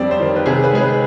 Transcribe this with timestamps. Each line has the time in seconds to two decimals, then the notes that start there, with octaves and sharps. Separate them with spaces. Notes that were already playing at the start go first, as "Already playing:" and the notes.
Already playing: F2 G3 C4 D5
0.11 C5
0.20 D#3
0.36 B4
0.46 C3 G#4
0.64 B4
0.73 G#3 G#4
0.81 B4